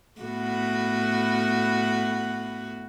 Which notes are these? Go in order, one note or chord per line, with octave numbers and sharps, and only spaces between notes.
A2 B3 F#4